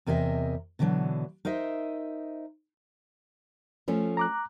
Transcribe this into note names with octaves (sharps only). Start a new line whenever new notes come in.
E2 C3 A#4 D#5 E5
B2 D3 E3 F#3 D4
D#4 A#4 C5 D#5 E5
F3 A3 C#4
A#5 D6 F#6